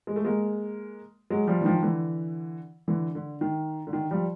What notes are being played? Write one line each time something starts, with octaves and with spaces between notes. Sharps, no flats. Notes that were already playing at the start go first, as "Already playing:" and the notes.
G#3
A3
G#3 A#3
F#3 G#3
F3 G3
E3
D#3 F3
D3 E3
D3 E3
D3
D#3
D3
D#3
F3 G3